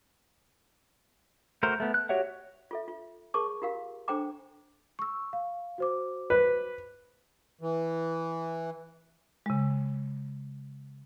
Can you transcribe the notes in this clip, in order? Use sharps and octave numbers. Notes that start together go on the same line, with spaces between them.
A3 F#4 A#4 C5
A3 B3
F#6
F#4 G4 C#5 E5 F#5
F4 A4 E5
F4
G#4 A#4 C#5 A5 C#6 D6
F4 G4 A#4 F5
D4 A4 C5 G5 A#5 D6
C#6 E6
F5
F#4 C5 D6
B4
E3
C#3 G#3